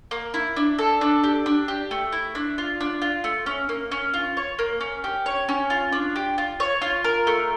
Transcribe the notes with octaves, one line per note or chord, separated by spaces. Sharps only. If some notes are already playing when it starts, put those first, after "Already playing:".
A#3
E4
D4
A4
D4
G4
D4
G4
A3
E4
D4
F4
D4
F4
A3
C#4
A#3
C#4
F4
C#5
A#3
C#4
G4
C#5
C#4
F4
D4
G4
F4
C#5
F4
A#4
A3